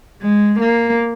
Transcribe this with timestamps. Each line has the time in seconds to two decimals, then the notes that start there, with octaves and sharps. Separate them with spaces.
0.22 G#3
0.60 A#3